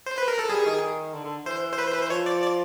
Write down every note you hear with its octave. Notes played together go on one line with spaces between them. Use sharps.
C5
B4
A#4
A4
G3 G#4
D#3
D3
D3
E3 C5
C5
B4
C5
B4
C5
F3 C#5
D5
D5